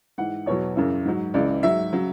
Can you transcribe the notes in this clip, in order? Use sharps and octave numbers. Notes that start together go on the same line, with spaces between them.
G#2 E3 F#5
E2 B2 F#3 C#5
F#2 C#3 E3
G#2 F#3
C#2 C#3 E3 D5
G#2 F#3 E5
C#3 F#3